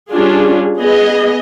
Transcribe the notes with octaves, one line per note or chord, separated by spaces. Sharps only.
G3 C#4 D4 F4 G#4
B3 G#4 D#5